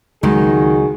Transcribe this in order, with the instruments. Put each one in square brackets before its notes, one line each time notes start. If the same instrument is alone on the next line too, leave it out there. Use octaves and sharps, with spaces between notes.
[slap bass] C#2 F#3 [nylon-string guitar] D#3 G#3 [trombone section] D#4 F#4 G#4